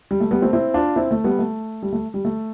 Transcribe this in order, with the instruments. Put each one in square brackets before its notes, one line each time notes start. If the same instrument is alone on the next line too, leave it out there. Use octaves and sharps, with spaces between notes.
[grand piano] G3
A3
G3 B3
A3 C4
C4 E4
D4 F4
C4 E4
A3
G3 B3
A3
G3
A3
G3
A3